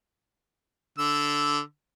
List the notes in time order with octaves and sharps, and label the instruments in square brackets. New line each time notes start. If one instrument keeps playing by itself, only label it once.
[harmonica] D3 E6